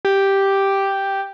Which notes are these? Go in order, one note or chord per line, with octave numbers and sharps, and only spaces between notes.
G4